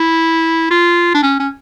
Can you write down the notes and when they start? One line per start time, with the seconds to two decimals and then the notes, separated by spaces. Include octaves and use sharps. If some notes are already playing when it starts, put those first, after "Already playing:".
Already playing: E4
0.71 F4
1.14 D4
1.23 C#4
1.40 C#4